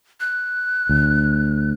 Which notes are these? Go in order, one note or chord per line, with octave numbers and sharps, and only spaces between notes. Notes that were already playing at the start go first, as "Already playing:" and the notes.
F#6
D2